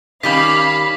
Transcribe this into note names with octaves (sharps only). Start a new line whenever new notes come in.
D#3 G3 C#4 F5 B5 D6 B6